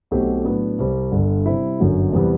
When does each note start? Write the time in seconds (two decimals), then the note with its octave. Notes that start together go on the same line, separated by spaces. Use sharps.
0.11 B1 B2 A3 C4 G4
0.45 A2 F#3 B3 D4
0.78 C2 C3 G3 C4
1.12 G1 G2 D3
1.46 C3 G3 C4 E4
1.79 G1 F#2 D3 F#3
2.12 E2 C3 E3 G3 B3